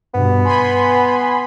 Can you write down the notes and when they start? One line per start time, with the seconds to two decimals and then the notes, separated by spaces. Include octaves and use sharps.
0.14 G2 B2 B3
0.45 G#5 B5 C6